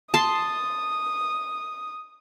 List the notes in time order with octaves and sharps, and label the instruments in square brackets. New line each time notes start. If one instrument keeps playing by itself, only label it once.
[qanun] A5 C6 [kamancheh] D#6